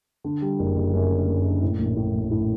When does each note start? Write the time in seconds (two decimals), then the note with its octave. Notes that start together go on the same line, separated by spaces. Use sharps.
0.24 D3
0.42 G3
0.59 F#1
0.76 F#1
0.94 F#2
1.11 D3
1.27 F#2
1.45 D3
1.62 A2
1.79 A#1
1.96 A2
2.14 A#1
2.31 A2